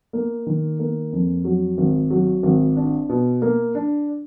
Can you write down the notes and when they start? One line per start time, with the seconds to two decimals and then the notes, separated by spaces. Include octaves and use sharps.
0.13 A#3
0.47 D#3
0.79 A#3
1.12 F2
1.45 F#3
1.78 G#1
2.10 F#3
2.43 G#1
2.76 D4
3.09 B2
3.42 A#3
3.75 D4